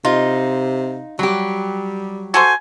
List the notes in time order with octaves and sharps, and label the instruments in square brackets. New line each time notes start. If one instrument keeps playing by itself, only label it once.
[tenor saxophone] C3 [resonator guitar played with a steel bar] D#4 [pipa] F4
[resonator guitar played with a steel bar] F#3 G4 [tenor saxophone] G3
[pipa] F#4 A4 C5 [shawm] G#5